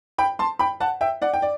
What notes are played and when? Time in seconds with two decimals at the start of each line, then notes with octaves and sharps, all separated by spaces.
0.18 G5 B5
0.39 A5 C6
0.59 G5 B5
0.80 F#5 A5
1.01 E5 G5
1.22 D5 F#5
1.34 G5
1.42 D5